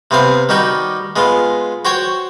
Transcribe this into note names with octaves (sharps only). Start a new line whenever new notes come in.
C3 B3 C4 F5
D#3 G3 D#4 F#4 G4
G#3 B3 F4
F#4 C5 C#5 G5